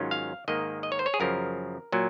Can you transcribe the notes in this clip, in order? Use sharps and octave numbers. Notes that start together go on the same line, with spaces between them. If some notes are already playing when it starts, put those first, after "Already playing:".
Already playing: G#2 D#3 F#3 C#4 F4
F5
G#2 D#3 A#3 D#5
D#5
C#5
C5
C#5
G#4
F#2 C#3 F3 A#4
A#2 F#3